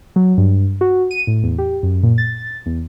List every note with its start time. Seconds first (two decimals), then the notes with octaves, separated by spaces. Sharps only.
0.16 F#3
0.38 G2
0.81 F#4
1.11 D#7
1.27 A2
1.43 E2
1.58 G4
1.83 F#2
2.03 A#2
2.18 A6
2.66 E2